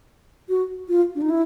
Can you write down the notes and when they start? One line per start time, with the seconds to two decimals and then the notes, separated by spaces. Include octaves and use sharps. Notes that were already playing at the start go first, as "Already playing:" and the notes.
0.49 F#4
0.89 F4
1.15 D4
1.22 D#4
1.30 E4